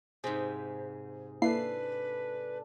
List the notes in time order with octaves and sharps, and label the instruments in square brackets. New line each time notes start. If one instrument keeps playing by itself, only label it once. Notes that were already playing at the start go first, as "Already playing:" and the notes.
[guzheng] G#2 C3 [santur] G#4
[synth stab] A#3 E4 C7 [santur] D4 A4 [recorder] B4